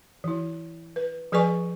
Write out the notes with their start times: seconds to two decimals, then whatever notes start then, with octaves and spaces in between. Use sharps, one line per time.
0.24 E3 E4
0.96 B4
1.32 F3 G#4 B4 D5 G#5 C#6